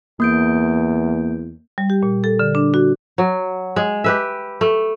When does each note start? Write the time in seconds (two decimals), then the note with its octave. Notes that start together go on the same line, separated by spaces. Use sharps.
0.20 E2 A#3 G6 D7
1.78 G3
1.90 G4
2.03 A#2
2.24 A4
2.39 D3
2.55 D4
2.74 F#4
3.18 F#3
3.76 G#3
4.04 G4 B4 E5
4.61 A3